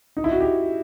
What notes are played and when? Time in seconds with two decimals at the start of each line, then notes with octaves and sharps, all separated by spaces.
0.17 D#4
0.24 E4
0.32 F#4
0.41 G4